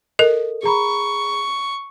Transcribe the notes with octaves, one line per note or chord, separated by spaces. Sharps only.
A4 A#4 D#5
G#4 A#5 B5 C#6